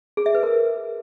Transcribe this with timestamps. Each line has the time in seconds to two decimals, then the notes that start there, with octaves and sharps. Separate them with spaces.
0.17 G#4
0.26 E5
0.35 B4
0.43 A#4